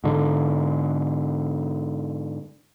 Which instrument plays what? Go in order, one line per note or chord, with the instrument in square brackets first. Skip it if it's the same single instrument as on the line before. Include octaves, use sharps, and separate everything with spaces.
[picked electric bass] G#2 D3